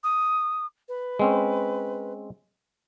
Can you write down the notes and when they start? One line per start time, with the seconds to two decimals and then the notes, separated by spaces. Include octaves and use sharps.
0.03 D#6
0.88 B4
1.19 G#3 C4 C#4